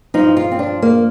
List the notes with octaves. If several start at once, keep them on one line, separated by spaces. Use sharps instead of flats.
G2 F3 D#4
F4
C4
D4
A#3